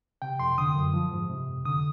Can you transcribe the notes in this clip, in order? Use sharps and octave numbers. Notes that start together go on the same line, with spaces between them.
C3 G5
F2 C6
D3 D#6
F#2
F3
G#2
C3
F2
D3 D#6